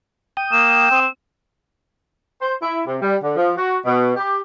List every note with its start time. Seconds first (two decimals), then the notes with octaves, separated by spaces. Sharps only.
0.37 G5 D#6
0.52 A#3 E7
0.91 C4
2.41 C5
2.60 E4
2.86 C3
3.02 G3
3.21 D3
3.36 F3
3.57 F#4
3.85 B2
4.16 G4